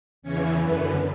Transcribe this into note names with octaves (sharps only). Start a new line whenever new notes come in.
E2 C#3 E3 C#4 C#5
F#2 D3 B3 B4